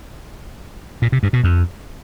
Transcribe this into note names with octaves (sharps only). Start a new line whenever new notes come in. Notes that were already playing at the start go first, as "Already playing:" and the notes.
A#2
C3
G2
B2
F2